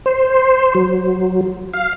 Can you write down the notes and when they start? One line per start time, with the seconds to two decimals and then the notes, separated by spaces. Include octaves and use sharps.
0.06 C5
0.75 F#3
1.74 F5